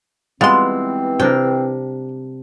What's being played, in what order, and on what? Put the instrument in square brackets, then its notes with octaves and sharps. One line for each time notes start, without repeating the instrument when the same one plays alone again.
[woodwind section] E3 C4 [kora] G3 G#3 B3 [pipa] F4 C6
[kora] C3 D4 A#4 [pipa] G5